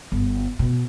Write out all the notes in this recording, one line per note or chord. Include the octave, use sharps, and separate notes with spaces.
G1
B2